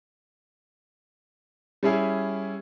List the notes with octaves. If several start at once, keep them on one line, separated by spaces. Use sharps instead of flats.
G3 C#4 E4 G#4 E5